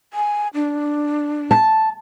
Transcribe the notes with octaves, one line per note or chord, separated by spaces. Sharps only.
G#5
D4
A5